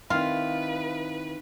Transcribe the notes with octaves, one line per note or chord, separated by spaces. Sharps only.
D#3 C4 E4 F4 B4